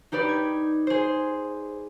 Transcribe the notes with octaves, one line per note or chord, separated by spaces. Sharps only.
D#4 G4 B4 D5
G#6
G#4 C5